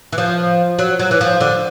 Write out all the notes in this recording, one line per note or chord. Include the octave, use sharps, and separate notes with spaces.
E3
F3
F#3
F#3
E3
F3
D3